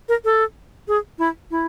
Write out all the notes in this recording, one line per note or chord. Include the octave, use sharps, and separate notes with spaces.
A#4
A4
G#4
E4
E4